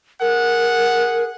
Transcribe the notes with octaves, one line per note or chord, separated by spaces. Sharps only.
G#4 A#4 F#5